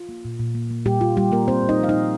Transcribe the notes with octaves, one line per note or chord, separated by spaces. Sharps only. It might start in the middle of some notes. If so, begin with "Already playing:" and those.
Already playing: F4
A#3
A#2
A#2
A#3
A#3
A#2 G3 G4
A#2 F4
G3 A#3 G4
A#3 A#4
C4 C5
A#2
D#4 D#5
F3 F5
A#2 D#4 D#5